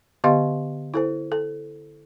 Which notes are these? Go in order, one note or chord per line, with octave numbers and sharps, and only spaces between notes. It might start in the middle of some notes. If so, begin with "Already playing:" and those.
D3 B3 G4 D#5 F5 C6
E4 A4 C5
A4